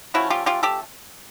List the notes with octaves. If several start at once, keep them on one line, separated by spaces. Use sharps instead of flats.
F3 A3 C#4 E4 F#4
F4 G4
F4 G4
G4 A4